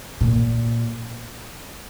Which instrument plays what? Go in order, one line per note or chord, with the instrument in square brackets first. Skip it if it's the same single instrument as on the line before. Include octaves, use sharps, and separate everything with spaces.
[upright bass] A#2